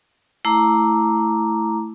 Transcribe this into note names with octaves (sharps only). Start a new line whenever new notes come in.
A3 E4 A#5 D6